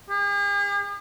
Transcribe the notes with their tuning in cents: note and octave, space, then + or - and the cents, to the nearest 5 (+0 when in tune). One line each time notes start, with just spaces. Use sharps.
G#4 -45